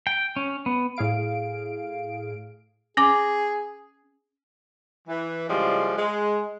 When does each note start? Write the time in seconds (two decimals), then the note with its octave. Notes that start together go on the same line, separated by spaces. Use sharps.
0.07 G5
0.36 C#4
0.66 B3
0.96 A2 G#4 F5 D7
2.97 C#4 G#4 G#5 D6
5.08 E3
5.49 A2 C#3 F3 G3 G#3
5.96 G#3